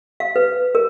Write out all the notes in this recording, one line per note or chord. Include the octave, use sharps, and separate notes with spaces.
F5
B4
A#4